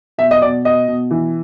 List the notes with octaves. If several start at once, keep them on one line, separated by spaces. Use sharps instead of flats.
B2 E5
D#5
B2 D5
B2 D#5
B2
E3